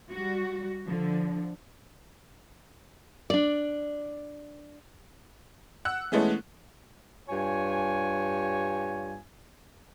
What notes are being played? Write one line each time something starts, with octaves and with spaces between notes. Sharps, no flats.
G3 F#4
D3 F3
D4 D5
F#5 E6 F#6
E3 G#3 A3 B3 C#4
G2 F4 C#5 G#5